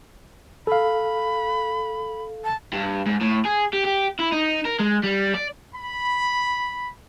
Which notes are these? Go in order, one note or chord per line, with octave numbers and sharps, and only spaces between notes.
A4 F5 B5
A5
G2
G#2
A2
G#4
G4
G4
E4
D#4
A#4
G#3
G3
D5
B5